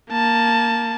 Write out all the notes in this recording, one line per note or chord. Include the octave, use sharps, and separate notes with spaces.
A#3 A5